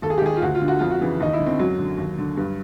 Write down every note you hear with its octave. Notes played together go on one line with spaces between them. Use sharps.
D#2 A4
G#4
G4
D#3 G#4
F4
D2 F#4
F4
D3
F#4
F2 F4
F#4
C#3 E3
D#2 D#4
E4
D3
C4
F#2 F#3
D3
D#2
D3
G2